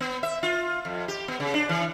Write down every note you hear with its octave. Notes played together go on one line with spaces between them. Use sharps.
B3
E5
F4
F2
G4
B3
C#3
D4
E3